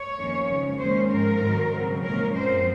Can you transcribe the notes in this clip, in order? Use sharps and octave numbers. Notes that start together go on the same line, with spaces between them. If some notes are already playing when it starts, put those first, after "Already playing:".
Already playing: C#5
F2 D#3 A#3 C#4
C#3 F3 G#3
D#2 D#3 G#3 C#4 C5
G#2 F3 C4 A#4
G#2 D#3 F#3 C4
C#3 F#3 C4
A#2 F3 G#3 C#4 A#4
F#2 F3 C4 C5